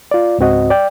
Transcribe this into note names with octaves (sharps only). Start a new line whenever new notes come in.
F4 D5
C#2 G#2 C4 F#4 D#5
D5 G5